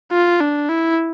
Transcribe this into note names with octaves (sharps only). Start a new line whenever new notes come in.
F4
D4
E4